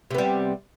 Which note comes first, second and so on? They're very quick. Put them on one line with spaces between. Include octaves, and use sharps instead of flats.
C3 B3 G3